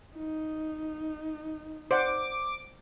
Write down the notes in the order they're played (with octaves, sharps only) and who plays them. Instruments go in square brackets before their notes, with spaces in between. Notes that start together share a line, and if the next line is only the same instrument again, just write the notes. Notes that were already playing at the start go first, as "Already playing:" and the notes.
[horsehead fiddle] D#4
[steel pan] C5 D5 F#5 [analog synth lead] D6